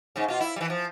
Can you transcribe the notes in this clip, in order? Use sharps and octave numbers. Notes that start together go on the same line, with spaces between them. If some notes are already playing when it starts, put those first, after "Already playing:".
G#2 C#3
B2 F4
E4
E3 G3
F3